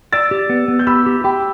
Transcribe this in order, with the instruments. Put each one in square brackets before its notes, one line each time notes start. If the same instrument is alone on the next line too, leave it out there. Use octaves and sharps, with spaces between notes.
[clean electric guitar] D5 [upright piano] E6 A6
[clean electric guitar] G4
B3
B3
[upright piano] G6
[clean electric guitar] G4 [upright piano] B5 E6
[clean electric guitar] G4
[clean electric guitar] G4 [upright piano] G5 B5